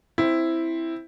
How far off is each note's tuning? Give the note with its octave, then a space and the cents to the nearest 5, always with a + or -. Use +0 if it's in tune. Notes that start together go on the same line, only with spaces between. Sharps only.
C4 +5 E4 +0